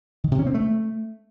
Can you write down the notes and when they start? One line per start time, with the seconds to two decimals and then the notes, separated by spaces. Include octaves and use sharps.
0.24 D#3
0.31 C3
0.39 C#4
0.47 C4
0.54 A3